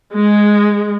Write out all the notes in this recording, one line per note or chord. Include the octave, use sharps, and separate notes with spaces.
G#3